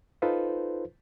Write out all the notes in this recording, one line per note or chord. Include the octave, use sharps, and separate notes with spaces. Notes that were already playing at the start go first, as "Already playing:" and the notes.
D#4 F4 A4 B4 C5